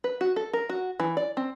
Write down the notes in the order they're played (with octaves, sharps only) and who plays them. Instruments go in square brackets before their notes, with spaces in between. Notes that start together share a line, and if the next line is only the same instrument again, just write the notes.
[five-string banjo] B4
F#4
A4
A#4
F#4
E3
D5
C4